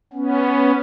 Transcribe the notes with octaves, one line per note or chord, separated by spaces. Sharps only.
B3 C#4